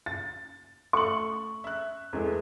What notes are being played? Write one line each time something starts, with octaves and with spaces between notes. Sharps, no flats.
A6
A3 C#6 F#7
E5 F#6
E2 G#3 A3